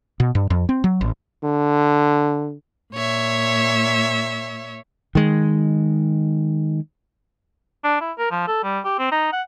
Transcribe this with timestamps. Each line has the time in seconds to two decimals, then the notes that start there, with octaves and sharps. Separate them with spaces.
0.20 B2
0.35 G2
0.50 F2
0.69 C4
0.84 F#3
1.01 A1
1.43 D3
2.92 A#2 C#5 E5
5.15 D#3 G#3
7.84 D4
8.01 E4
8.18 A#4
8.31 F3
8.48 A4
8.63 G3
8.85 G4
8.99 C4
9.12 D#4
9.33 F#5